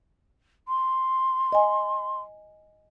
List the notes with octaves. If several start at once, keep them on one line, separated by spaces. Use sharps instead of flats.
C6
D#5 G#5